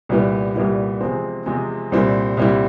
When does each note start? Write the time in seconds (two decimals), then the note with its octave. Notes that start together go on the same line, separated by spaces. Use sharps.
0.09 C2 A#2 G3 B3 E4
0.55 C2 A#2 G3 B3 E4
1.01 E2 C3 F3 G#3 C4
1.46 E2 C3 F3 G#3 C4
1.92 C2 A#2 G3 C4 E4
2.37 C2 A#2 G3 C4 E4